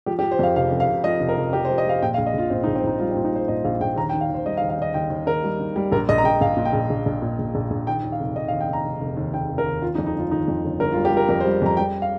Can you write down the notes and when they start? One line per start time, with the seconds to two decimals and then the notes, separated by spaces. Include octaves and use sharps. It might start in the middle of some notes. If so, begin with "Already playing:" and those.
0.06 F3 G4
0.19 G4
0.23 F3
0.31 C5
0.39 F2 F5
0.56 F1 F5
0.71 F1
0.80 F5
0.89 F1
1.04 F3 D#5
1.20 F1
1.29 A#4
1.37 F1
1.53 F1 G4
1.65 C5
1.70 F3
1.78 D#5
1.85 F3 F5
2.02 A#2 G5
2.14 F5
2.18 A#1
2.26 D#5
2.34 A#1 F4
2.50 A#2 C4
2.63 D#4
2.67 A#1
2.76 C4
2.84 A#1 D#4
2.99 G3 F4
3.11 C4
3.16 A#2
3.24 D#4
3.32 G3 C5
3.48 A#2 D#5
3.65 A#1 F5
3.81 A#1 G5
3.97 D#2 A#5
4.09 G5
4.13 D#3
4.21 F5
4.30 D#2 C5
4.46 G3 D#5
4.57 F5
4.62 D#2
4.70 F5
4.79 D#2 D#5
4.94 D#2 G5
5.10 D#2
5.27 D#2 A#4
5.44 G3
5.60 D#3
5.76 G3
5.92 A#1 A#4
6.09 A#1 D#5
6.18 A#5
6.24 A#1 G5
6.41 A#1 F5
6.57 A#2
6.65 G5
6.73 A#1
6.90 A#1
7.06 A#1
7.22 A#2
7.39 A#1
7.55 A#1
7.71 A#1
7.87 D#3 G5
8.03 D#2
8.12 F5
8.20 F1
8.36 F1 D#5
8.48 F5
8.52 D#2
8.61 G5
8.69 F1 A#5
8.85 F1
9.01 F1
9.17 D#2
9.34 D#2 G5
9.49 F1
9.58 A#4
9.66 D#2
9.82 D#3 F4
9.95 D#4
9.99 F2
10.06 D#4
10.15 G1 F4
10.31 D#3 D#4
10.48 F2
10.64 G1
10.80 G1 A#4
10.92 F4
10.97 G3
11.05 G4
11.12 G3 A#4
11.29 F2 A#4
11.40 C5
11.46 G3
11.62 F2 A#5
11.77 G3 G5
12.02 F5